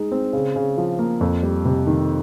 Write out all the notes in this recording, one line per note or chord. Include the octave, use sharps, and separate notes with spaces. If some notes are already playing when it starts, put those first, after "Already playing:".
Already playing: G#3 D#4
C4
C#3
C#3
F3
A#3
F2
G3
C3
D#3